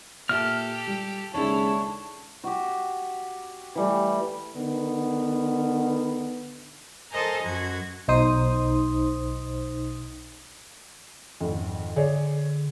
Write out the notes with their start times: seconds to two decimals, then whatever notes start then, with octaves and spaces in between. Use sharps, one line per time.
0.29 A#2 G4 A4 E5 F6
0.87 G3
1.34 D#2 C#3 G#3 D4 E4 A4 C#5
2.44 F#4 G4
3.75 E3 G3 A3
4.57 D3 D#3 B3
7.11 A4 A#4 C5 D#5 G#5 A#5
7.42 F#2 F#4 G#6
8.08 B1 D#4 C5 D#6
11.41 G#1 F2
11.96 D3 G#4 C#5 D5